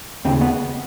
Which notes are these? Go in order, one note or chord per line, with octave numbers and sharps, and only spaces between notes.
D#2 C#3 C4
B3